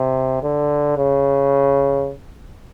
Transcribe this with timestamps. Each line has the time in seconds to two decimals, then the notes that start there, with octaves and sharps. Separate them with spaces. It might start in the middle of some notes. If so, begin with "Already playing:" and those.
Already playing: C3
0.43 D3
0.97 C#3